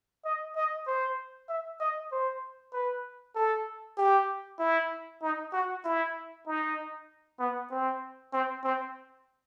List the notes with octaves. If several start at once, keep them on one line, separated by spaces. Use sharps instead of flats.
D#5
D#5
C5
E5
D#5
C5
B4
A4
G4
E4
D#4
F#4
E4
D#4
B3
C4
C4
C4